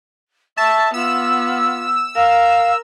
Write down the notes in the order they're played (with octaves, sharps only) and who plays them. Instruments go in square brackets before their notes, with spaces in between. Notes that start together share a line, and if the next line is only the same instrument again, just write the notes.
[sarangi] E5 [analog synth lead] A5 [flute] C#6
[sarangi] B3 [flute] F4 [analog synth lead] E6
[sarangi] A#4 [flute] F5